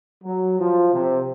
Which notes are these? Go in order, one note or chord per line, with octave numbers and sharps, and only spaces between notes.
F#3
F3
C3